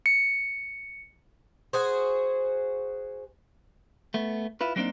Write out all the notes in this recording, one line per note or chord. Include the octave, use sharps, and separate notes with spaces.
C#7
F#4 G#4 C5
A3 B3
E4 F4 B4
F#3 G3 A#3 C4 D4 D#4